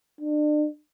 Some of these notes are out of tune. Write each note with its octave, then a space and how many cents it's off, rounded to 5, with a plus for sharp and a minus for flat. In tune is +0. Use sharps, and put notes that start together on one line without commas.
D4 +40